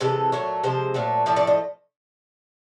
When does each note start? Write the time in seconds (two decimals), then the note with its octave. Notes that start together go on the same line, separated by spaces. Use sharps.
0.01 C3 E3 G#3 A4
0.32 A#2 F#3 A3 C#5
0.63 C3 F3 G#3 C5
0.94 A#2 F#3 A3
1.26 A2 F3 A3 D5
1.36 D5
1.47 D#5